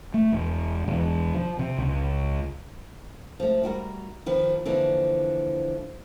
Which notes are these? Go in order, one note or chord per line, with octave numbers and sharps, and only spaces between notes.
A3
E1
E1
F3
C3
C#2
F3 A3
G3 F#4 A#4
D#3 F3 B4
D3 E3 F3 A#3